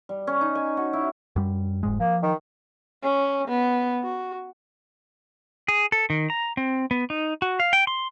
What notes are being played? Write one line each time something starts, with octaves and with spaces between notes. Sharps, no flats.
G3
C#4
D#4
G#5
F#4
E4
F#2 G3
F1 G#2 G#3
F3 A#3
D#3
C#4
B3
F#4
G#4
A4
D#3
A#5
C4
B3
D#4
F#4
F5
G5
C6